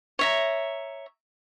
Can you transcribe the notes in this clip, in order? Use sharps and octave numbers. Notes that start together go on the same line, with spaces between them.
C#5 E5 A#5